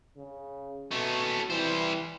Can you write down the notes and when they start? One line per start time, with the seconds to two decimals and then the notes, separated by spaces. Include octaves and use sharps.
0.17 C#3
0.92 B2 A3 C#4
1.50 E3 G3 C5